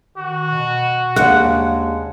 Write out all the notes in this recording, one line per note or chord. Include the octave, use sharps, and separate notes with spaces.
D#3 F#4
B2
D#2 C#3 G#3 D4 F#5